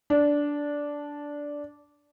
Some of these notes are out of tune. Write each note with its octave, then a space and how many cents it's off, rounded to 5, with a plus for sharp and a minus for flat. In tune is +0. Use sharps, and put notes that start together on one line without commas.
D4 -10